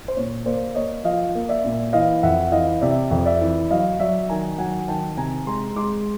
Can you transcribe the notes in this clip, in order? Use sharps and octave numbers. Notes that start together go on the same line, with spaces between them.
C5
A#2 C#5
A#3 C5 D5
A#3 C#5 D#5
F3 D#5 F5
A#3
D5 E5
A#2
E3 D#5 F5
F2 E5 F#5
E3 D#5 F5
C3 D5 E5
F2
D5 E5
E3
F#3 D#5 F5
F#3 D5 E5
D#3 G#5 A#5
F#3 F#5 G#5
D#3 G5 A5
C3 G#5 A#5
G#3 A#5 C6
G#3 C6 D6